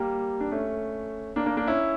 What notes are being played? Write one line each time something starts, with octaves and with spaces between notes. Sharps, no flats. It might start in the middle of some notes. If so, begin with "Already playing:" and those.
Already playing: G3 A#3
D4
A3 C#4
A#3 D4
A#3 D4
A#3 D4
C#4 E4